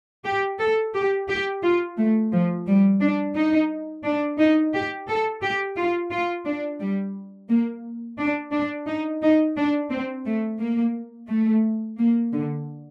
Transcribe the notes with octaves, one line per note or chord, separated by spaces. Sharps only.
G4
A4
G4
G4
F4
A3
F3
G3
D4
D#4
D4
D#4
G4
A4
G4
F4
F4
D4
G3
A#3
D4
D4
D#4
D#4
D4
C4
A3
A#3
A3
A#3
D3